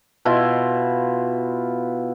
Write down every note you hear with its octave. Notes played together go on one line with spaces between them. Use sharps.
B2 E4 F4 C6